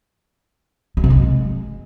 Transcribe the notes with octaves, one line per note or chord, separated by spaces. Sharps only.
G#3
C3
G#3